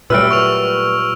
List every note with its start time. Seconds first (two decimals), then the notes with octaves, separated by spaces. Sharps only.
0.10 A#2 F#3 G3 A3 B4 E6 F6 D7
0.31 C#6 F7